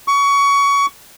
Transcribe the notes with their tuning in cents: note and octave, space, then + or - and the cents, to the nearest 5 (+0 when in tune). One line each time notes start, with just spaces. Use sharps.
C#6 +25